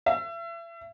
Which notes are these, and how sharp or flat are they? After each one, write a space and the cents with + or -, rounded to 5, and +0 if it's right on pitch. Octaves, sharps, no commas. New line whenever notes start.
E5 +35